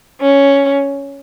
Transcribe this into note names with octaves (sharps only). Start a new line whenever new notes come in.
C#4